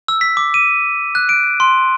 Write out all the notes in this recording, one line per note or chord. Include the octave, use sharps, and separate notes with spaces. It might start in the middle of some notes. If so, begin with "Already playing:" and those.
E6
B6
D6
D#7
F#6
D7
C6